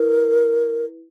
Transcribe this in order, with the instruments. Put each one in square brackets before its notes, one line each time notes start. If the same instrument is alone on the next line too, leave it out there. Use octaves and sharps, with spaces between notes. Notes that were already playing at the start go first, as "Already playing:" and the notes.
Already playing: [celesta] E4 B4 [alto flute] A#4